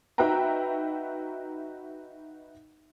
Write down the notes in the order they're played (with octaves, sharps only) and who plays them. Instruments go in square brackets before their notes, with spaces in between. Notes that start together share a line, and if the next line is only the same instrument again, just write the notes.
[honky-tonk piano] D#4 F#4 B4 E5 G5 A#5